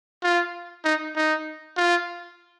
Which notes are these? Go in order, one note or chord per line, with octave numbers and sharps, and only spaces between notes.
F4
D#4
D#4
F4